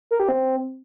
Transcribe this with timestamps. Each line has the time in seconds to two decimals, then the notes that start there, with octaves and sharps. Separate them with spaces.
0.11 A#4
0.20 G4
0.29 C4